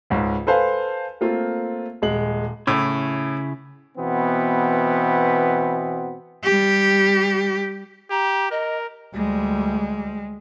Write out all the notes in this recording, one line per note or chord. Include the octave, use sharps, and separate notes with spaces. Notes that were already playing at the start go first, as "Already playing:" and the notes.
C#2 G#2 C#3
A4 B4 C5 F5 G#5
A3 A#3 C4 F4
D#1 G#3 F#7
A2 C#3 E4
B2 E3 B3 C4
G3 G4
G4 A#5
A#4 D#5
D2 G3 G#3